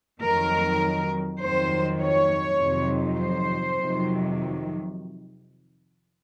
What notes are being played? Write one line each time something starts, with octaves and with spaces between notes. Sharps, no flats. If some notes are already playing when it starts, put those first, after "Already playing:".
F2 D#3 F#3 A#4
F2 D#3 F#3 C5
C#5
F2 C3 D#3 F#3
C5
F2 C3 D#3 F#3